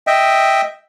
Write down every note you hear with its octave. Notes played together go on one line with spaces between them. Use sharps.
D#5 E5 G5